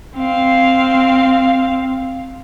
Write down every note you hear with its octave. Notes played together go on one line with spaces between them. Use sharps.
C4 F5